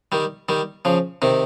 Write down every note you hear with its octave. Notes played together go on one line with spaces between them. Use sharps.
D#3 G3
D#3 G3
C#3 F3
C3 D#3